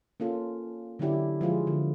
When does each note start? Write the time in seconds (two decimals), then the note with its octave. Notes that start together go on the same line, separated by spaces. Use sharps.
0.20 A#3 C#4 F4 A4
0.99 D3 F#3 C#4 E4 G4 D5
1.41 F3 G#3 F4 G#4
1.67 D3